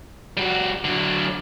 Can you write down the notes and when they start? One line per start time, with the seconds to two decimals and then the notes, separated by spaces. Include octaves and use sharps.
0.37 G3 F#4
0.85 D3 F#3